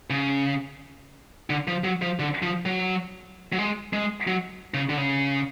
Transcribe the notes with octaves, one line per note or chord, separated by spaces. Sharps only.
C#3
D3
F3
F#3
F3
D3
F3
F#3
F#3
G#3
G#3
F#3
C#3
D3
C#3